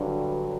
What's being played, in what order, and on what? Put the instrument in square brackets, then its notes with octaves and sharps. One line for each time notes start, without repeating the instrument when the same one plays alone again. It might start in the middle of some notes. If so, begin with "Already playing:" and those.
Already playing: [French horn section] G2 D3 F#3